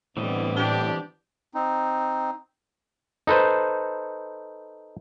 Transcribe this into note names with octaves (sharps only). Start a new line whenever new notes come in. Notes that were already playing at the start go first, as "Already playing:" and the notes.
A2 D3 E3 G3 B3 C4 D#5
D4 G4
C4 D#4
D#4 A4 B4 C5